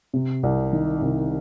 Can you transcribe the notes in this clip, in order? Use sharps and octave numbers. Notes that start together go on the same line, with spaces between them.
C3
C2
D#3
C2